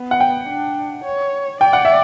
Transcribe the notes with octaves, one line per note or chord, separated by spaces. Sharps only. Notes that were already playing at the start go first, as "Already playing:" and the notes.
Already playing: B3
F#5
G5
D4
C#5
D5 G5
F#5
E5